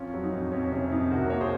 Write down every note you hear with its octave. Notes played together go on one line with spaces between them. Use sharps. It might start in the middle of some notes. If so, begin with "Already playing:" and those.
Already playing: F2 C#4 F4
F#3
D#4
F2
F2 C#4
C3 C#4
F2 D#4
C2 F#4 A#4
A#3 C#5
G#4 C5